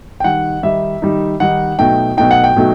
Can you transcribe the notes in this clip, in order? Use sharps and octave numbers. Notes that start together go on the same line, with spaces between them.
G5
D#3 G3 D#4 F#5
D#3 G3 D#4 E5
D#3 G3 D#4
D#3 G3 D#4 F#5
B2 F#3 A3 D#4 G5
B2 F#3 A3 D#4 G5
F#5
G5
B2 F#3 A3 D#4